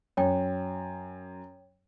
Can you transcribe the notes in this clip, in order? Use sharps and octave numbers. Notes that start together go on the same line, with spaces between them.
F#2 C#5 G5